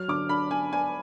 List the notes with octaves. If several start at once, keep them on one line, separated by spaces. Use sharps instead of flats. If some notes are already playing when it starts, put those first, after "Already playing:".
Already playing: F#3 F6
D3 D6
D4 B5
D4 G#5
D4 G#5